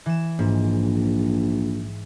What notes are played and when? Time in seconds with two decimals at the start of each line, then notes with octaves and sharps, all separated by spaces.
0.06 E3 E7
0.39 A#1 G#2